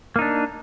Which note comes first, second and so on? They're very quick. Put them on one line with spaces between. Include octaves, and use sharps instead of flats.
A#3 D#4 D4